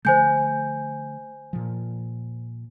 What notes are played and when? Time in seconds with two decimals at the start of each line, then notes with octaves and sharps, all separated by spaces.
0.05 D3 F3 A3 C5 G#5 G6
1.53 A#2 F3